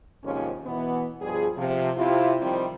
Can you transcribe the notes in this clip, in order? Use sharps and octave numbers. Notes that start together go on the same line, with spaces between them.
D#2 G#2 C3 F3 C#4
B2 E3 B3
G2 B2 F3 G3 G#4
C3 F3
C3 E4 F4
C3 D#3 F3 G3 C4